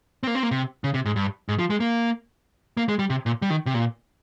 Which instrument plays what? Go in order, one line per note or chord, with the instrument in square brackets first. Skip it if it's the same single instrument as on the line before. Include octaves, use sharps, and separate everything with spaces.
[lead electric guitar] C4
A#3
C4
A#3
C3
C#3
C3
G#2
G2
G#2
F3
G#3
A#3
A#3
G#3
G3
C3
A#2
G3
D#3
C3
A#2